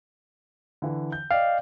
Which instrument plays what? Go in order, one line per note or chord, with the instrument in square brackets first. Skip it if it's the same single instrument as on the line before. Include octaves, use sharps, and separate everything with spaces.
[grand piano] D3 E3
G6
[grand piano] D5 D#5 G5 [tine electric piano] F5